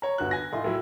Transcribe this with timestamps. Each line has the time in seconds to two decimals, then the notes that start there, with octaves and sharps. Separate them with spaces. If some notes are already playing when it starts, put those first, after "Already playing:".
0.02 C#5 A#5
0.18 G1 F#4 F#6
0.31 G#5 A#6
0.52 A2 D#4 F4 C6
0.64 A2 F#3 E4